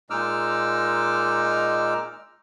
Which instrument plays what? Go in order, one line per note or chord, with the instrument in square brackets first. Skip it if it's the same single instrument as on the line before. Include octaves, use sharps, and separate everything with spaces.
[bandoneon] A#2 G#3 D#4 D6 E6 F6